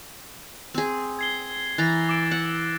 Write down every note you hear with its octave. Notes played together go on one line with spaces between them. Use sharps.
C4 G#4
G#6 C7 G7
E3 A#5 F#6 A6 A#6
D6 E6 D7
F#5